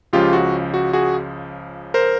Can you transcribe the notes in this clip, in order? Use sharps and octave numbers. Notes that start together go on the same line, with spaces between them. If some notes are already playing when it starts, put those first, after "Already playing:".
C#2 C#3 F3 F4 G4
F#4
F#4
F#4 G#4
A#4 C5